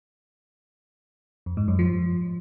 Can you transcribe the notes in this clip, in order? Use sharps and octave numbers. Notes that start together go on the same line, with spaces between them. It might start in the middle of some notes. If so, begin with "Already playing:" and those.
F2
G#2
F#2
F3